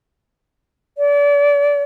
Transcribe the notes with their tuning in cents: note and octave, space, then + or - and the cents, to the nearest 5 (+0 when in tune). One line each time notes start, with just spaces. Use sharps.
D5 -35